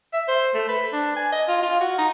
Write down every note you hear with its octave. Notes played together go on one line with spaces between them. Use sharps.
E5
C5
A3
B4
D4
G#5
D#5
F4
F4
F#4
D#4